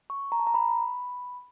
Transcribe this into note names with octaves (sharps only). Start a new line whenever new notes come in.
C#6
A#5
A5
A#5
B5